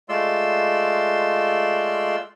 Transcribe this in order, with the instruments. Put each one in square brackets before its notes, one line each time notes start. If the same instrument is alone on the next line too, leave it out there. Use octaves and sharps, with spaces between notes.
[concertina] G#3 A3 F4 D5 C6 E6